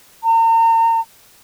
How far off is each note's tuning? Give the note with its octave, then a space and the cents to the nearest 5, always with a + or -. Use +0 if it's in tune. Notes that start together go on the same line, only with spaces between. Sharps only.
A#5 -40